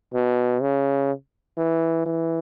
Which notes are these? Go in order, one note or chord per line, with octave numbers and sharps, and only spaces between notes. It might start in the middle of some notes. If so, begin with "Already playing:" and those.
B2
C#3
E3
E3